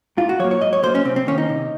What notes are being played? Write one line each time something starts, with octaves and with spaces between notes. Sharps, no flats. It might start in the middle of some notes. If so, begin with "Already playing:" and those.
G#2 F4
F#4
F#3 A#3 C#5
C#5
G#2 D#5
C#5
F#3 A#3 C5
C#4
C3 C4
C4
D#3 A#3 C#4
D#4
C3